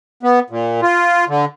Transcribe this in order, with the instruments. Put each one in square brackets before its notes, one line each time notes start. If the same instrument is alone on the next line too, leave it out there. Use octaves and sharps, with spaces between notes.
[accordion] B3
A#2
F4
D3